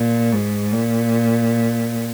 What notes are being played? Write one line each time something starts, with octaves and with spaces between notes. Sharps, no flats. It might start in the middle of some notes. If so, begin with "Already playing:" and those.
Already playing: A#2
G#2
A#2